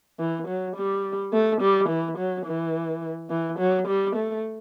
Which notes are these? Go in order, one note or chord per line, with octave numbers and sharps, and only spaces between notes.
E3
F#3
G3
A3
G3
E3
F#3
E3
E3
F#3
G3
A3